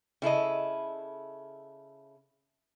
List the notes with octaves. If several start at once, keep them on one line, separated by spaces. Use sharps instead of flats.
C#3 E4 A4 D#5